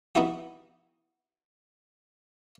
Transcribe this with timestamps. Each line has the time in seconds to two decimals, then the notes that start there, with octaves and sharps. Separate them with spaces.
0.15 B3 D#4 E4 F#4 G4